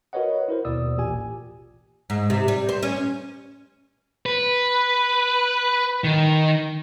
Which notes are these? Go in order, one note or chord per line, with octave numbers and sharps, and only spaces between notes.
F#4 A#4 B4 C#5 D#5 F#5
E4 A#4 C5
D#2 B2 D5 D#6 E6
A1 A#2 G4 G#5
G#2
C3
G3
C5
C#4
B4
D#3